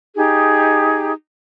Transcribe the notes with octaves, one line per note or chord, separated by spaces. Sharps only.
D#4 G4 G#4